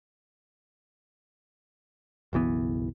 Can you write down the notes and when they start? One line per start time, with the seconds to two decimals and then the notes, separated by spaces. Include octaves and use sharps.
2.33 F#1 B1 E3 B3